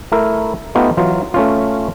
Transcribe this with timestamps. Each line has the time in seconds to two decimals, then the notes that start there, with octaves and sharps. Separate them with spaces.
0.12 A3 E4 A#4
0.75 A3 B3 D#4 F4 G4
0.97 E3 F#3 F4
1.34 A3 C#4 F4